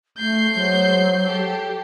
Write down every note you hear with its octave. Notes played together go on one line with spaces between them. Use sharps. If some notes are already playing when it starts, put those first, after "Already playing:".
A3 G6 C7
F#3 G#3 C5
G4 A4